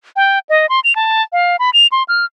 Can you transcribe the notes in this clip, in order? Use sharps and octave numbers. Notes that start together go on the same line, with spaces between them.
G5
D#5
C6
F7
A5
F5
B5
F7
C6
F6